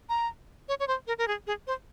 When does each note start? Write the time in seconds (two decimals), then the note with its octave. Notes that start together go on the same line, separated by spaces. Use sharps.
0.09 A#5
0.68 C#5
0.80 C#5
0.88 C5
1.07 A#4
1.18 A#4
1.28 G#4
1.47 G#4
1.67 C5